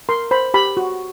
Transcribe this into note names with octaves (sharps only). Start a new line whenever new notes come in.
A#4 C6
C5 B5
G4 B5
F#4